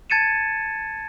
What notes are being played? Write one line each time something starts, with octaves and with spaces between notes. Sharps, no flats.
A5 G#6 A6 C#7 D#7 E7